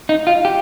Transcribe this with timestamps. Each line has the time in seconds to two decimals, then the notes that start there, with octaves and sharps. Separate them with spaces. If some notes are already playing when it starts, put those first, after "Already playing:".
0.09 D#4
0.27 F4
0.45 G4